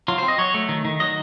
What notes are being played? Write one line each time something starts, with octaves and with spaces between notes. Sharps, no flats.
F#3 F4
C5
C4
D#5
F#3 C#5
A3
D#3
D#3
F#3 D#5